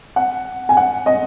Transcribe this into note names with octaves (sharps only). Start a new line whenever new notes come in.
F#5
G#5
F#5
D#5